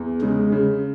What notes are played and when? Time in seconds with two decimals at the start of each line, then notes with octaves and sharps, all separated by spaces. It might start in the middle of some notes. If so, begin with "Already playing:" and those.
Already playing: E2
0.21 C#3 G#3
0.52 C#3